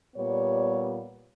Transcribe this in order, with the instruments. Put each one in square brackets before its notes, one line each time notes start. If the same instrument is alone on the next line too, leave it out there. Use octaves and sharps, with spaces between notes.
[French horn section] A#2 G3 B3 C#5